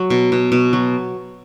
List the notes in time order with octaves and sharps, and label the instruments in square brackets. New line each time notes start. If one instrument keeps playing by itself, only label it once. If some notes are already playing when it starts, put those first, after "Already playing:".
Already playing: [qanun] F#3
B2
B2
B2
F#3